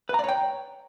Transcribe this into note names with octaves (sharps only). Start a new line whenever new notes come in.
B4 C#5 D5 G5 A#5